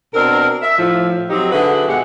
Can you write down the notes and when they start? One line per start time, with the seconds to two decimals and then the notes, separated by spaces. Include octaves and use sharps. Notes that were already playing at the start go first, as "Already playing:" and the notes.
0.14 B2 C4 D4 A#4
0.62 E5
0.77 A2 F3
1.30 F#3 C4 D#4 G4
1.52 D3 F#4 G#4 B4 E5
1.88 B2 D3 G#3 G4 F#5